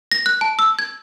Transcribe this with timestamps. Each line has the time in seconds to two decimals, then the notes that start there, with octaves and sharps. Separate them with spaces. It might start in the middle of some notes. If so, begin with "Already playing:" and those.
0.12 A#6
0.26 F#6
0.41 A5
0.59 E6
0.79 G#6